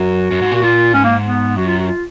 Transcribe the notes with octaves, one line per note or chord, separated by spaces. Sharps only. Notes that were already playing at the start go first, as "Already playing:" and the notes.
Already playing: F#2 F#4
F#2
G#2
A#2
F#4
A#2 F4
G#2 C#4
A#3
B3
F#2 F#4
F4
F#4
F4